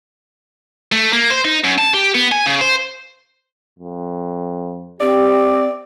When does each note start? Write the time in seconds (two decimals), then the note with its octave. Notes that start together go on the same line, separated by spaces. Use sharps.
0.92 A3
1.13 A#3
1.30 C5
1.45 D#4
1.64 F#2
1.78 A5
1.94 G4
2.15 B3
2.32 G#5
2.46 C#3
2.61 C5
3.79 F2
5.01 C4 G4 D5